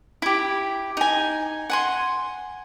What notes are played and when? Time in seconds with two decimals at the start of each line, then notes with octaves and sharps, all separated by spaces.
0.22 E4 G4
0.97 D#4 G#5
1.70 F#5 G#5 C6